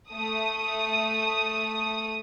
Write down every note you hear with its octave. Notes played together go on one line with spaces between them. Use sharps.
A3 D#6